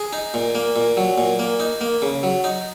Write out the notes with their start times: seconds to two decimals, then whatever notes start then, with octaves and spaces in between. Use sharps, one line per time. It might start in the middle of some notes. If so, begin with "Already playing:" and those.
Already playing: G#4
0.13 D#4
0.34 A#2
0.55 A#3
0.76 A#2
0.97 F#3
1.18 A#2
1.39 A#3
1.60 D#4
1.81 A#3
2.02 C#3
2.23 F#3
2.44 D#4